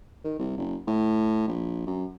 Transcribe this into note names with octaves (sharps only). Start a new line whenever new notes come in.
D#3
C2
F#1
A2
A#1
F#2